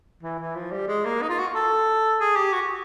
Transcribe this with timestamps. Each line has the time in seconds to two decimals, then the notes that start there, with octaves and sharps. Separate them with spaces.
0.23 E3
0.39 E3
0.55 F3
0.71 G3
0.88 G#3
1.05 A#3
1.22 D#4
1.29 F4
1.38 F#4
1.55 A4
2.20 G#4
2.36 G4
2.52 F#4